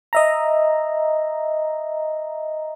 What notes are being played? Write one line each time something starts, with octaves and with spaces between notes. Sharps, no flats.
D#5 E5 A#5